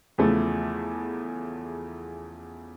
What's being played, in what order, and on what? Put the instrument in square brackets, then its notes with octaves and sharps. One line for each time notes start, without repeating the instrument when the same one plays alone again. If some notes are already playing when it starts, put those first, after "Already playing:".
[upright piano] E2 C#3 F3 A3